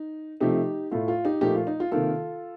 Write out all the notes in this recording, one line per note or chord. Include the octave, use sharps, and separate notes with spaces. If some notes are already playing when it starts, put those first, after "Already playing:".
Already playing: D#4
C3 F3 A3 D#4 G4
A2 A3 F4
F4
D#4 G4
A#2 F3 A3 D#4 G4
F4
D#4
F4
C3 D#3 A#3 F4 A4